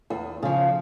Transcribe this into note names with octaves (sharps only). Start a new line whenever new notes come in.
E2
C#3 F3